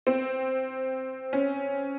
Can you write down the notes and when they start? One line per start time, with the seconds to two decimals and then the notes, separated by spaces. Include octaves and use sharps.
0.07 C4
1.33 C#4